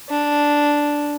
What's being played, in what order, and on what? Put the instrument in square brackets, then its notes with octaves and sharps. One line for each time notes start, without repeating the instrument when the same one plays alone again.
[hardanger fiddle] D4